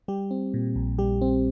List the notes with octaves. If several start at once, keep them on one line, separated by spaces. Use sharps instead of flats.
G3 G4
C4
A#2
A#1
G3 G4
C4